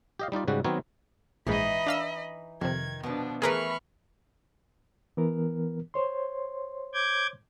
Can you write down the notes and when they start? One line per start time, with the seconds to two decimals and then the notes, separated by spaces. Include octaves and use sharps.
0.19 G4 D#5 F5
0.32 G3 D#4 F4 D5
0.48 G#2 C#3 G3 F#4
0.64 D#3 F#3 B3 C4 A#4 C#5
1.47 A#1 G#2 E3 D#4 D#5 B5
1.86 D4 F5 E6
2.61 F2 C3 D#3 G#6
3.03 B2 F3 B3 D4
3.42 E3 A3 G#4 A#4 B4 B5 C#6 F6
5.17 E3 B3 A#4
5.94 C5 C#5 C6
6.94 D6 G6 G#6